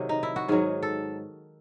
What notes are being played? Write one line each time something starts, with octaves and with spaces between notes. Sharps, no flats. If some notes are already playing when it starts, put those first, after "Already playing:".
Already playing: C3 D#3 F#3 G#4
D#4
E4
F#4
G#2 D#3 F#3 G#4
A4